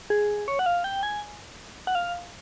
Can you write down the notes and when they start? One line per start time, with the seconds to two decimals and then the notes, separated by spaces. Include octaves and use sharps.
0.10 G#4
0.48 C#5
0.59 F#5
0.66 F5
0.84 G5
1.03 G#5
1.87 F#5
1.95 F5